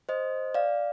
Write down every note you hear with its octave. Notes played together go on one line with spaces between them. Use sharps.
C5 D#5
D5 F5